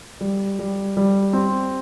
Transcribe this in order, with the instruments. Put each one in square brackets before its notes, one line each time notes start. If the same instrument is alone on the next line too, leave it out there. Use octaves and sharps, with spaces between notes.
[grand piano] G3
G3
G3
C4